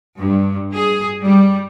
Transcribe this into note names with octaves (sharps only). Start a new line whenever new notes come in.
G2
G#4
G3